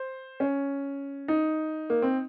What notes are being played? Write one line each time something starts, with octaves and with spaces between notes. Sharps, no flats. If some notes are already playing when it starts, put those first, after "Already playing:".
Already playing: C5
C#4
D#4
A#3
C4